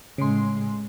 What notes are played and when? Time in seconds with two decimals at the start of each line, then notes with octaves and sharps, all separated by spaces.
0.18 A2 C#3 G#3 C6